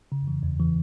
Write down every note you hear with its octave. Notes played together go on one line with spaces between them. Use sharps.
C#3
E3
E2
E3